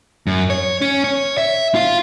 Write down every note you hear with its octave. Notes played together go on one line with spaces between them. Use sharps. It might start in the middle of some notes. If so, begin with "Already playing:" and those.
F#2
C#5
C#4
C#5
E5
F4 F5